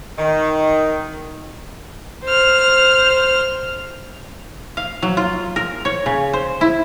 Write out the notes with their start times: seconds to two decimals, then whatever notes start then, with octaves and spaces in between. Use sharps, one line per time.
0.18 D#3
2.24 C5 F6
4.77 F5
5.03 F#3
5.17 F4
5.56 A#4
5.85 C#5
6.06 C#3
6.33 C5
6.61 E4